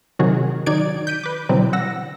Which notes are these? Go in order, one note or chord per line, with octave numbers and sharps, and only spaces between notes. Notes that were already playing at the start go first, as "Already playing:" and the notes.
C3 D#3 F#3 F#4 G#4
D#3 F#3 D#4 D5 G#6 D7
G6 B6 D7 D#7
B4 D6
B2 D3 E3 F#3 G3 C4
F#5 E6 A#6